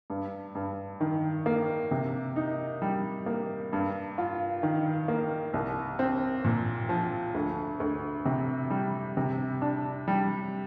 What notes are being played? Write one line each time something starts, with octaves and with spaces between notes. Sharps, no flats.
G2
G2
D#3
A#3
C3
D#4
G3
A#3
G2
F4
D#3
A#3
C2
C4
A#2
F3
D2
D2
C3
G3
C3
D4
G3